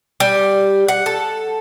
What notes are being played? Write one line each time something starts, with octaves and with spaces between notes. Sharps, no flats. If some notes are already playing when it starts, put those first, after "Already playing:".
G3
F#5
A4